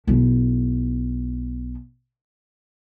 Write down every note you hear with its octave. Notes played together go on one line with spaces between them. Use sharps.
B1 E4